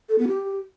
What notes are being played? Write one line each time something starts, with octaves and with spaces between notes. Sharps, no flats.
A4
B3
G4